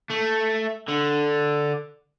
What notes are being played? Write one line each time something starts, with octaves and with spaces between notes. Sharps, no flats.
A3
D3